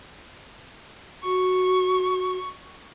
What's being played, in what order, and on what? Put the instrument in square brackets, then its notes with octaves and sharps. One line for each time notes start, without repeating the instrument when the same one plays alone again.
[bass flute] F#4 [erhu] C#6